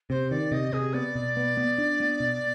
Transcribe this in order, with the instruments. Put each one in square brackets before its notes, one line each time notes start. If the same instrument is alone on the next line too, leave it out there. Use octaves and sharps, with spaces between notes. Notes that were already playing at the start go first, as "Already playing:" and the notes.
[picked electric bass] C3 [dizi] C5
[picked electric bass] D#3 [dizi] D5
[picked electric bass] C3 [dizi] D#5
[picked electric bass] C3 [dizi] G#4
[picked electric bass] B3 [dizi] D5
[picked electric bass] B2
B3
B3
D4
B3
B2